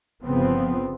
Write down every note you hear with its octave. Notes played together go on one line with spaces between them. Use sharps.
G1 C#3 F3 B3 C4